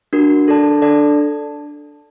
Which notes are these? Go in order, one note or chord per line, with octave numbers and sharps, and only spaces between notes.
D4 F#4 A#4
D4 A4 D5 A5
D4 A4 D5 A5